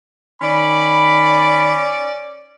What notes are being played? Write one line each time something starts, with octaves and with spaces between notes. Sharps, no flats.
D#3 C#4 D5 B5